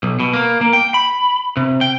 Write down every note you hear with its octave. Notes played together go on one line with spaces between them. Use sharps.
B1
B2
A#3
A#3
G5
B5
C3
G5